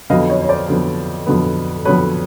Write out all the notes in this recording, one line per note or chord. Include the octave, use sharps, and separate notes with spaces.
F2 D3 F#3 B3 D#5 F5
C#5 D#5
C#5
C5 D5
F2 D3 F#3 B3
F2 D3 F#3 B3
F2 D3 F#3 B3 B4 C#5